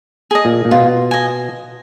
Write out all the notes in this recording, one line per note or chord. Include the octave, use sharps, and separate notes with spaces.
G#4 D#5
A#2
A#2
B2 F4
D#5 G#5